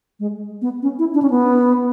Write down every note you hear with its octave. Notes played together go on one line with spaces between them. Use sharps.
G#3
B3
C#4
E4
D4
C#4
B3